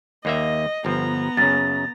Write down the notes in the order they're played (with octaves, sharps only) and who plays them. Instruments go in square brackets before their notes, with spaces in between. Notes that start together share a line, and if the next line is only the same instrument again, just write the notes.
[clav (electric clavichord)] D#2 A#3 E5 [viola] D#5
[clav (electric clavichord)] G1 F3 [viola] B3 A#5
[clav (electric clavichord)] F#2 C#3 [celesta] A6